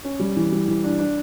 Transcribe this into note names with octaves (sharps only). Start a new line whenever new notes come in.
C#4
G3
E3
G3
E3
D4
D4